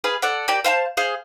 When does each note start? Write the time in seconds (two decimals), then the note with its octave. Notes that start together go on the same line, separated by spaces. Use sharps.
0.04 G#4 B4 F5
0.22 A4 D5 F#5
0.48 A#3 G4 D5
0.64 C5 F5 G5 A5
0.97 G#4 C5 F5